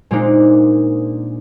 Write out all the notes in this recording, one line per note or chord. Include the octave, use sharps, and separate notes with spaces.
A#2 G#3 A#3 C4 D4 D#4